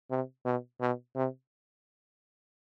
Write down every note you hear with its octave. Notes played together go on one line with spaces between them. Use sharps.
C3
B2
B2
C3